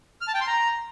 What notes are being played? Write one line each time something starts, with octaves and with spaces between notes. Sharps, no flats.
F6
A5
G5
C6
A#5